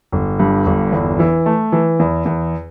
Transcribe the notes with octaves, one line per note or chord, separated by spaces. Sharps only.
G1
G2
G1
E2
E3
A3
E3
E2
E2